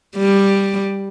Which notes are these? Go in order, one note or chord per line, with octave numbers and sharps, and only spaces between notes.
G3